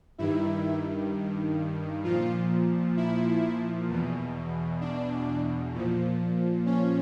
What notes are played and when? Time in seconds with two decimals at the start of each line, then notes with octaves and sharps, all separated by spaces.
0.18 G2 D#3 E4
2.04 A#2 F3 F4
2.97 E4
3.89 E2 B2
4.81 D4
5.74 A#2 F3
6.66 C#4